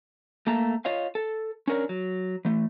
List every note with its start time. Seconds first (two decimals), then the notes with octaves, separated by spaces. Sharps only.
0.47 A3 A#3 A5 A#5
0.85 F4 C#5 D#5 F5
1.15 A4
1.68 C#4 D4 A#4 C#5
1.89 F#3
2.45 E3 A3